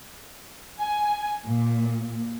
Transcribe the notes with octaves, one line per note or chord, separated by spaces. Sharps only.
G#5
A#2